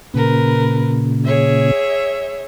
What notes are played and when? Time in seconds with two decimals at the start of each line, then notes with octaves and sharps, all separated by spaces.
0.14 A#2 C#3 A#4 B4
1.25 G#4 C#5 E5